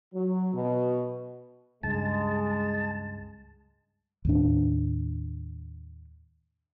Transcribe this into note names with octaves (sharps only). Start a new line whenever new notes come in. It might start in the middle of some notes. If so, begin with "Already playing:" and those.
F#3
B2
C#2 G2 G#3 A5
D#2 A2 D4